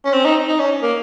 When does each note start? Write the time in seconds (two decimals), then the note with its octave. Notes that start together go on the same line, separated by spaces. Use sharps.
0.05 C#4
0.13 C4
0.25 D#4
0.48 D#4
0.59 C#4
0.82 A#3